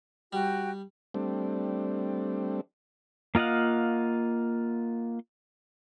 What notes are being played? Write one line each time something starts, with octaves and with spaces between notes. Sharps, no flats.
G3 F#4 G5
G3 A3 C4 D4
A#3 F4 D#5 F5 F#5